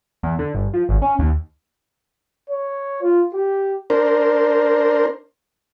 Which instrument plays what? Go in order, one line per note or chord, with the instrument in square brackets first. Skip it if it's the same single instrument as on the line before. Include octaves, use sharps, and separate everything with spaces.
[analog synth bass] E2
D3
G1
F3
G#1
C#4
D#2
[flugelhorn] C#5
F4
G4
[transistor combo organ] D4 A#4 C5